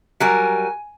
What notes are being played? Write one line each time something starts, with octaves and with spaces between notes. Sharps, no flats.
F#3 G3 A#4 G#5